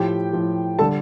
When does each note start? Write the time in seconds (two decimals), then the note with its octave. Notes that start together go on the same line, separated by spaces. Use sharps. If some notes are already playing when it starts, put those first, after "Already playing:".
Already playing: A2 F3 G4 G5
0.33 A2 F3
0.79 D3 G3 A4 A5